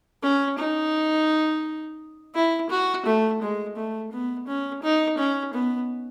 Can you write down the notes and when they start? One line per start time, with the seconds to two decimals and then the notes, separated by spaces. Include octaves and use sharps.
0.23 C#4
0.58 D#4
2.35 E4
2.70 F#4
3.06 A3
3.42 G#3
3.76 A3
4.12 B3
4.48 C#4
4.83 D#4
5.18 C#4
5.54 B3